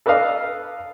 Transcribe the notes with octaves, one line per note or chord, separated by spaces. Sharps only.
A4 B4 D5 D#5 F5